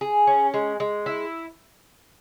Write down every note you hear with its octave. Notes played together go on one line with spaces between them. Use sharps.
G#4
C#4
G#3
G#3
E4